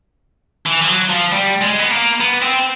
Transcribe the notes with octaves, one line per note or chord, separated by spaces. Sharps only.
E3
F3
F#3
F3
G3
G#3
B3
A#3
B3
C4